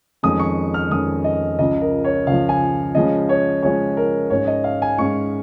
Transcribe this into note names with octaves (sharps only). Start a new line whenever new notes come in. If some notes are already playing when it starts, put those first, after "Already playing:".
F2 D#3 G#3 C#4 D#6
C#6
F6
F2 D#3 G#3 C#4 D#6
D#5
C#2 C#3 F3 D#5
A#4
C#5
C#2 C#3 F3 F5
G#5
C#3 F3 G#3 C#4 D#5
C#5
C#3 F3 G#3 C#4 C#5
A#4
G#2 G#3 C#4 C#5
D#5
F5
G#5
G#2 G#3 C#4 C#6